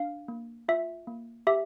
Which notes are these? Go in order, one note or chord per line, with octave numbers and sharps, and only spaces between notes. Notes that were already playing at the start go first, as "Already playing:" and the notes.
Already playing: D4 F5
A#3
F4 E5
A#3
G4 E5